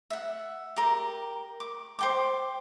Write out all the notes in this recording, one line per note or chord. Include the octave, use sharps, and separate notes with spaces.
E5 F#5
G4 A#4
D6
C5 G5 D6